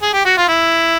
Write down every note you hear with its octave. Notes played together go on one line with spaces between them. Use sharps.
G#4
G4
F#4
F4
E4